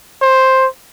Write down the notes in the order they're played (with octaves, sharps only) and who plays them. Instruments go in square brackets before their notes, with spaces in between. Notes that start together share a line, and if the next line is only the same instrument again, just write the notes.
[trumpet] C5